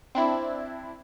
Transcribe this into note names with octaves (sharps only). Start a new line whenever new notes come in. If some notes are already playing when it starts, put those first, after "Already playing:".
C4 D4 E4